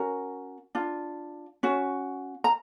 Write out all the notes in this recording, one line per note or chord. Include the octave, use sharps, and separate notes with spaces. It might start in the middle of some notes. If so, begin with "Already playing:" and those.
Already playing: C#4 F#4 A#4
D4 F4
C#4 F#4
A#5